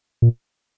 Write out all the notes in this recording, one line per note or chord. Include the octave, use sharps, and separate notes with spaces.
A#2